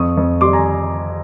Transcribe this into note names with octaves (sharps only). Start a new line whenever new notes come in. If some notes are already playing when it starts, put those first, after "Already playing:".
Already playing: F2 C#6 D#6
F2
G3 C6 D6
G#5 A#5